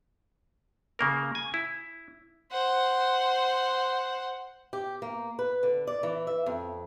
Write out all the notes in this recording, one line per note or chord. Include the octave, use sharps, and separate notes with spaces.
C#3 A#3 A#4
G#5
E4
C5 F#5
G4
A#3
B4
D3
D5
E3
E5
F2